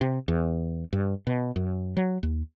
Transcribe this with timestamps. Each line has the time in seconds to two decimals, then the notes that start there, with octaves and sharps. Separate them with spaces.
0.01 C3
0.28 E2
0.93 G2
1.27 B2
1.56 F#2
1.97 F#3
2.23 D#2